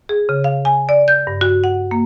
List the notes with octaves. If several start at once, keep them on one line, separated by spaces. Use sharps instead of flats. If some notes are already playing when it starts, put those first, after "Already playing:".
G#4
C#3
F5
G#5
D5
G6
G2
F#4
F#5
A#3